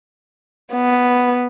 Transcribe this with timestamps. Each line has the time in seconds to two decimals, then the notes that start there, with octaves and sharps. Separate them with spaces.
0.73 B3